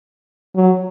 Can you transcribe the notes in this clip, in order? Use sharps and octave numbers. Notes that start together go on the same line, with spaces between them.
F#3